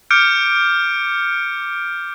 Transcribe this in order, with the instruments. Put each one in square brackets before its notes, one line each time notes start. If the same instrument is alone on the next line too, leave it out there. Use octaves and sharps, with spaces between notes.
[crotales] D6 F6 G6 C#7 D7